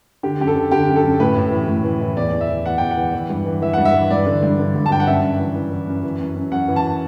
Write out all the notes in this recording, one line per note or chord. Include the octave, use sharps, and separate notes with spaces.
D3 G4
F#2 G4
A4
D3
D3 G4
F#2
A4
F#2
A2 B4
A2
E3
A2
E3
E3
E2 D5
E2
E5
E3
E3 F#5
E2 G5
F#5
E3
E3
G2
E3
E3 E5
G2 F#5
E5
E3
G2 D5
D3
G2
D3
G2
A5
G2 G5
F#5
F#2 E5
F#2
E3
E3
E3
F#2
E3
F#2
F#2
F#2 F#5
E3
A5